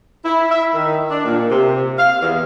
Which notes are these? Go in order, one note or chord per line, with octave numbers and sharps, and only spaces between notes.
E4
E5
D#3
D4
A#2
C3
F5
E2